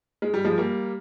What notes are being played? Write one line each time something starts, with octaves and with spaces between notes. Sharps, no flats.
G#3
G3
F3 G#3
G3 A#3